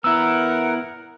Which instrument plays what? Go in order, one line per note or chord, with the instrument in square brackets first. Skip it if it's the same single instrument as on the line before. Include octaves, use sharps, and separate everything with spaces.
[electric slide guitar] B3 E4 [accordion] A#4 [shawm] F#5 [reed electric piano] E6